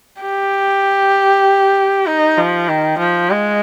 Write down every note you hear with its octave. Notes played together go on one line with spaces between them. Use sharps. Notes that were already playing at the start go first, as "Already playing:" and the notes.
G4
D#4
F3
D#3
F3
G#3